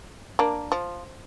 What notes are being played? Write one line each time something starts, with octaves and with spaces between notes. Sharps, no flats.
A#3 D4
F3